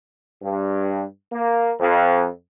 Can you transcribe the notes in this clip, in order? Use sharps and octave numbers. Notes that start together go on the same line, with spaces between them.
G2
A#3
F2